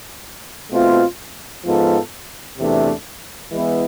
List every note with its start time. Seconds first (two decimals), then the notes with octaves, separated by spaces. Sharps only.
0.70 B2 A3 C4 F4
1.64 G#2 F3 B3 F4 A4
2.57 E2 C3 E3 A3 D4
3.52 E3 G#3 B3 E4